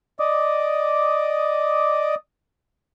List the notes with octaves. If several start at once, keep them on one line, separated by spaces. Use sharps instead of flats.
D5 D#5 D6 D#6